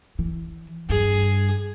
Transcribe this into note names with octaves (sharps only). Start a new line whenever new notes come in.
E3
G2 G#4